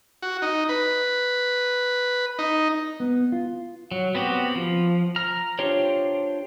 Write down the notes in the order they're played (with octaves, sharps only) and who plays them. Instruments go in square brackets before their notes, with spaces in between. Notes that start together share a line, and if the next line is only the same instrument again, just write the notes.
[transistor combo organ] F#4
D#4
B4
D#4
[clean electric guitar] B3
F4
[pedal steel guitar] F#3
B3 C4 F#4 G4
F3
A#5 F6
D4 F4 G4 C5 C#5